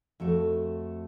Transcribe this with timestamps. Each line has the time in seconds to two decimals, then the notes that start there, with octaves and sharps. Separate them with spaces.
0.20 F2 A3 F#4 A4